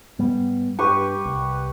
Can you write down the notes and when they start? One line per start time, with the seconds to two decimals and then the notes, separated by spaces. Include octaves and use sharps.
0.19 G#2 G3 B3
0.79 G2 G4 B4 C#6
1.25 C2